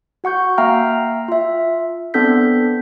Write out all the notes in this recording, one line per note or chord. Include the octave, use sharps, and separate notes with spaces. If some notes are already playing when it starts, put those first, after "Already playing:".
F#4 F#5 C#6 G6
A#3 E5 F5 G5 A#5 F6
F4 E5
B3 C4 D4 A4 G6 B6